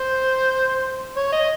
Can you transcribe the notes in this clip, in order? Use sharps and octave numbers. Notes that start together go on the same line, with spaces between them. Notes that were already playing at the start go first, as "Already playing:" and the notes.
Already playing: C5
C#5
D#5